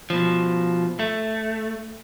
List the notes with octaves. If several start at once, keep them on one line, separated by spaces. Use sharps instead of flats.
B2 F3
A3